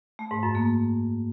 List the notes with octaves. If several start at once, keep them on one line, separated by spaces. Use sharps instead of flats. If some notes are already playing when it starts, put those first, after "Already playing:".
A3
G#2
F#2
A#3